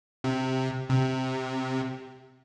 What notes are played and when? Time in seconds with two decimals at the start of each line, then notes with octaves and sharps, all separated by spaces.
0.24 C3
0.89 C3